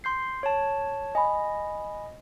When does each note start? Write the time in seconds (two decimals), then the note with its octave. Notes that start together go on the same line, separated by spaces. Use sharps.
0.04 C6 G6 C7
0.43 C#5 A5
1.15 D#5 G#5 B5